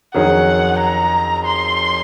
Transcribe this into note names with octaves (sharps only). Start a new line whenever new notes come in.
F2 D#3 F#3 C#4 G#4 F#5
A#5
C6